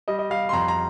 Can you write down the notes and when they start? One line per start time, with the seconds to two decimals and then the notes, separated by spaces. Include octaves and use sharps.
0.08 G3 D#5
0.19 D#5
0.30 G3 F5
0.49 C6
0.53 F2 A#5
0.68 A#5